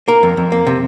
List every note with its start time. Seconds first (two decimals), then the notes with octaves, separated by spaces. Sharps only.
0.08 A#3 A#4
0.23 F2
0.37 F2
0.52 A#3
0.67 C3